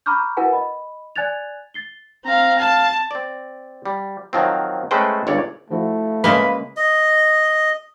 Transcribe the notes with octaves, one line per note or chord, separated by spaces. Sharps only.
A#5 B5 C#6 D6 F6 G6
E4 F#4 A#4 B4 F#5 G#5
D#5 B5
D5 G#5 F#6 G#6 A6 F7
A6 C7 G7
C4 F5 A#5
F5 A5
C4 D5
G3
D#3 F3 F#3 C4
G#3 A3 C#4 B4 C5 G5
G1 C#2 C#5 D5
F3 A3 E4 F#4
C#3 G#3 A#3 B4
D#5